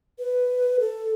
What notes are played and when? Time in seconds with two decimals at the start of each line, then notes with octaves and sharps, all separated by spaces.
0.19 B4
0.80 A4